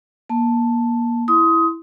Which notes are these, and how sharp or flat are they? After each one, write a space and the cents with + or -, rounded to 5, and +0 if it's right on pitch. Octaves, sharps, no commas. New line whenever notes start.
A#3 +25 A5 +0
E4 +0 C6 -15 D#6 +20